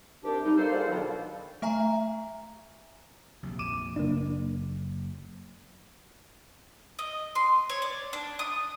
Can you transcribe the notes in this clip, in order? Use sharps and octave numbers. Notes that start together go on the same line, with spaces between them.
C2 D4 G4
G3 D#4
A#3 D#4 A4 C5
F4 G#4 C5 D5 F5 F#5
B2 D3 D#3 F#3
A3 E5 G#5 A#5
A#1 F2 C3
D6 D#7 E7
F#1 A#3 D4
D#5
C6
C#5
D5
D4
D#6